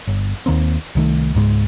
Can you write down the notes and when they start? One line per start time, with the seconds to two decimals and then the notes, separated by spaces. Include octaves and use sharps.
0.07 G1
0.46 D#2 D#3 A#3 C4
0.95 C2 D#3 A3
1.34 C#2 G#2 G#3